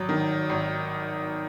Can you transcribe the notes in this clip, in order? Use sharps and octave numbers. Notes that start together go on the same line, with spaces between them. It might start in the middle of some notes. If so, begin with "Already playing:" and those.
Already playing: G#1 F#3
D#3
G#1